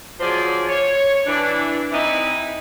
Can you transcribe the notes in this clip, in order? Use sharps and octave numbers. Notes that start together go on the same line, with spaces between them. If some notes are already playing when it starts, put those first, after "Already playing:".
F3 F#3 G#4 C5 D5
C#5
E3 D4
E3 C4 D#4 E4